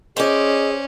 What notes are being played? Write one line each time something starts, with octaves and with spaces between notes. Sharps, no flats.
C#4 G#4 C5 D5 D#5